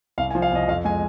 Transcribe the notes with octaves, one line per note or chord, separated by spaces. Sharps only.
C2 F5
G#5
F3
F5
C2 D#5
F2 F5
G#3 G#5